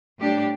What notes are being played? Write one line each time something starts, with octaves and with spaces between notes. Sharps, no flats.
A2 G3 D4 G4